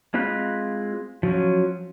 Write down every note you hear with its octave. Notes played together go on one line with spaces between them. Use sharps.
G#3 C4 F4 B5 F#6
F3 F#3 C#4